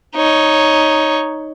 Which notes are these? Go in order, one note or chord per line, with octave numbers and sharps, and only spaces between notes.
D#4 C#5